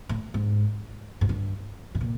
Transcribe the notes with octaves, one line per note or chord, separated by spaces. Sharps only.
A2
G#2
G#2
G2
A2
A#2